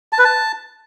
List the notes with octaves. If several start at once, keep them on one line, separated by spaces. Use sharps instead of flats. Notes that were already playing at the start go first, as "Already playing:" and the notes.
A5
B4
A5